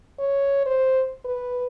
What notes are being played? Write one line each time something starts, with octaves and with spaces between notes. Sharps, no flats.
C#5
C5
B4